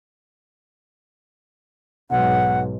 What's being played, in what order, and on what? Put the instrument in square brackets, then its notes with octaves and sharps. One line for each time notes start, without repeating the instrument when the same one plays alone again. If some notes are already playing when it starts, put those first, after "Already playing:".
[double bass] B1 G#2 [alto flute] F#5